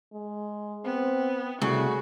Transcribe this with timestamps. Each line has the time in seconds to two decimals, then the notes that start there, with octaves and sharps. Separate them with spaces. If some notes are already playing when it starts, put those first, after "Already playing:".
0.13 G#3
0.85 B3 C4
1.62 C2 C#3 A3 F#4